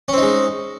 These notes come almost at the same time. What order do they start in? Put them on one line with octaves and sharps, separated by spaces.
C#4 C4 D#4 G#3